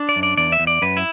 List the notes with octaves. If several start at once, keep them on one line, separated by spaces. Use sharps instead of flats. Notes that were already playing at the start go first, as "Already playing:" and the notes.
Already playing: D4
D5
F#2
D5
E2 D5
E5
E2
D5
F#2 B4
E4